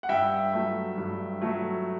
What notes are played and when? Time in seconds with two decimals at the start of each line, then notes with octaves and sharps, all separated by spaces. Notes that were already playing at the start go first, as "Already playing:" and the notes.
0.03 F#5
0.09 G2 E5 G5
0.53 F#3 A3
0.98 G2
1.41 F#3 A3